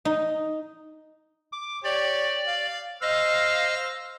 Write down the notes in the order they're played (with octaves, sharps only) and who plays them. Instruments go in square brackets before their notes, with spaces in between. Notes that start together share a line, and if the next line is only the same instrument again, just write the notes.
[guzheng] D#4
[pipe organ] D6
[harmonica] G4 C#5 [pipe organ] D5
[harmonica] F5
[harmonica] C5 E6 F6 [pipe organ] D#5 F5